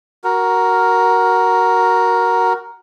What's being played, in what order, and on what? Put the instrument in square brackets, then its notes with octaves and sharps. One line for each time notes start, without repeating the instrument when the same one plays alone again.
[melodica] F#4 A#4